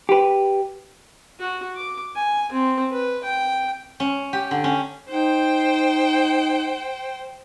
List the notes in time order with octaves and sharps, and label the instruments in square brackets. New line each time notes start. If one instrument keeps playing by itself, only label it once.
[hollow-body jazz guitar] G4 B4
[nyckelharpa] F#4
D6
G#5
C4
B4
G5
[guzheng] C#4
G4
D3
C#4
[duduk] D#4 [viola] C5 G5